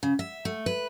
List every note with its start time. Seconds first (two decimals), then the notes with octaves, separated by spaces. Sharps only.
0.03 C#3
0.19 E5
0.45 A3
0.66 B4